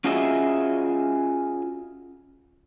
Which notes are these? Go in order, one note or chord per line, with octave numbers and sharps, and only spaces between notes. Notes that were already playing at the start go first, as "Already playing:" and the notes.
C#4 F4 F#4 G#4 D#5 E5